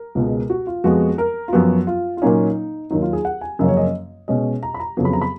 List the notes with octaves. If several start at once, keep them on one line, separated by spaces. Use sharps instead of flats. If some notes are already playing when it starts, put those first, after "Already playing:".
Already playing: A#4
C#2 B2 G#3
F#4
F4
F2 F3 G#3 B3 F#4
A#4
F4
F#2 F3 B3 F#4
F4
F4
A#2 F#3 A#3 C#4 D#4
D#2 D#3 F#3 D#4
F4
G#4
F#5
G#5
F#2 C#3 F3 A#3 C#4 D#5
C#5
D#5
B2 G#3 C#4 D#5
A#5
B5
A#5
F2 C#3 F#3 B3
B5
A#5
B5